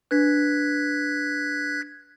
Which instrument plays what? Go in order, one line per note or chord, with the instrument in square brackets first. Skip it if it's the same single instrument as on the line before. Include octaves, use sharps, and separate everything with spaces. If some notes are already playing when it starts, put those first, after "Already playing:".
[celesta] D4 B4 [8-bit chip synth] F#6 G#6 B6